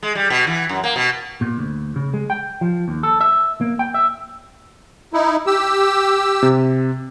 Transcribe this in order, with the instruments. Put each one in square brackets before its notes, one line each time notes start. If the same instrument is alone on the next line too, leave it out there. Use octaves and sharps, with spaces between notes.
[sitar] G#3
G3
B2
E3
F#2
A#3
B2
[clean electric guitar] A#2
D2
C#3
G#3
G5
F3
D#2
A4
E5
A#3
G5
E5
[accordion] D#4 E4
G4 E6
[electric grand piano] C3